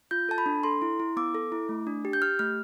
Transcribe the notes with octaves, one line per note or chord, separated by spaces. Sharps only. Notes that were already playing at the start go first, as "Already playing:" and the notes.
F4 G6
A4 A5
B5
D4
A4 C6
E4
E4
B3 D6
A4
E4
A3
D4
G4
G6
G4 F6
A3 F6